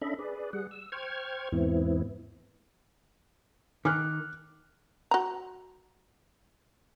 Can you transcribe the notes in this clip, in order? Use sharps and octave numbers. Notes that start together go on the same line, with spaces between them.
C#4 D4 A4 D#5 E5 B5
G#4 B4 D5
G3 G#4 F#5
E6
C5 G5 C#6 F6 G#6
E2 G#2 E3 B3 C4 E4
D#3 D6 F6 F#6
F#4 A#5